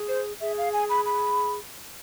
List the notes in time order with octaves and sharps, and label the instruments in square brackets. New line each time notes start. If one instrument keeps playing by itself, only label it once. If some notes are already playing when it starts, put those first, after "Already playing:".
Already playing: [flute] G#4
[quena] C5
[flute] G#4 [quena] E5
[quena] F5
G#5
B5
B5